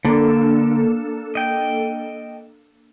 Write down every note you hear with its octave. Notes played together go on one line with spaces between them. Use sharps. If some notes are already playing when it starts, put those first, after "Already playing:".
D3 A#3 D4 A4
D#5 G5